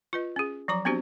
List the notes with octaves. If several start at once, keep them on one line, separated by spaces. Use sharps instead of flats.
F4 B4 D#5
C#4 G#4
F3 F#3 A#5 D6
B3 C4 D4 F#4 G4 C5